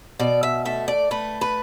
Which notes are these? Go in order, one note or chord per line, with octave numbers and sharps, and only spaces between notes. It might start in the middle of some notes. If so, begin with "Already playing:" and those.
B2 D5
E5
A3 E5
D5
A3 B4
B4